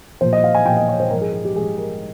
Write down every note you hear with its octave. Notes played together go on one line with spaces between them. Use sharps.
A#2 F3 C5
D#5
F5
G#5
A#2 F3 G5
D#5
C#5
C5
G#2 F3 A#4
G#4
G#4
G4
G#2 F3 G#4
A#4